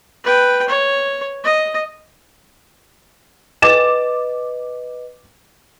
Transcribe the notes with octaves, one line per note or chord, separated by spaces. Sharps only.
B4 G5
C#5
D#5
B4 D#5 D6 A6 E7